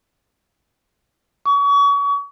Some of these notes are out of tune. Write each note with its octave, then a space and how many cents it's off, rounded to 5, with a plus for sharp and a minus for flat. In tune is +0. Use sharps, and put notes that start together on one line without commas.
C#6 +35